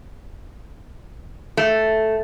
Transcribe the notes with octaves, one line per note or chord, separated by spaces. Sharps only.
A3